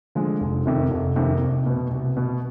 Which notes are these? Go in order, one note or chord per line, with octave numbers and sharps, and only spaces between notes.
D3 F3 G#3
F1
F2 C3 D#3
F1
F2 C3 D#3
C2
B2 B3
C2
B2 B3